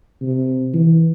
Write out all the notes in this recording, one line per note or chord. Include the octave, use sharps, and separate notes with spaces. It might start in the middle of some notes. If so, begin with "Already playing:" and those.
C3
E3